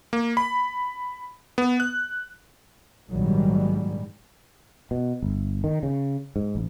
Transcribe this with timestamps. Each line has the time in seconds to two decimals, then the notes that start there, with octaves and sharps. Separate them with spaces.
0.13 A#3
0.37 B5
1.58 B3
1.80 F#6
3.09 A#1 G#2 D#3 F#3 G3
4.91 B2
5.22 G1
5.64 D#3
5.83 C#3
6.36 G#2
6.55 A1